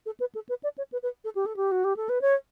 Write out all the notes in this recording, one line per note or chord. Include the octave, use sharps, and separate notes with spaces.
A4
B4
A4
B4
D5
C#5
B4
B4
A4
G4
A4
G4
F#4
G4
A4
B4
C#5